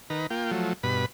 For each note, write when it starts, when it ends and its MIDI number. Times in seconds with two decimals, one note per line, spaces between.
0.10 0.27 51
0.10 0.27 71
0.10 0.27 82
0.30 0.51 58
0.30 0.51 65
0.30 0.51 79
0.51 0.73 53
0.51 0.73 54
0.51 0.73 57
0.83 1.06 43
0.83 1.06 47
0.83 1.06 71
0.83 1.06 83